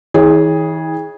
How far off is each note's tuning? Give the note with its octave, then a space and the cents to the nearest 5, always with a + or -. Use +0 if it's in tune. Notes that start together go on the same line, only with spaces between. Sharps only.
E3 -45 G#4 +0 C#5 +0